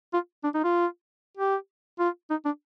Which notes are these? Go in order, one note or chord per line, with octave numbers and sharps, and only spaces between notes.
F4
D4
D#4
F4
G4
F4
D#4
D4